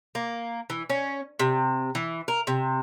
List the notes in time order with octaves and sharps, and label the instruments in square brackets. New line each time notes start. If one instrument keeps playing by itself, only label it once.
[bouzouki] A#3
E3
C#4
C3
E3
A#4
C3